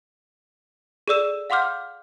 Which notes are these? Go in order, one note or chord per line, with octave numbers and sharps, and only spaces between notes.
G#4 A4 D5 E6 E7
F5 F#5 C6 D6 F6 G6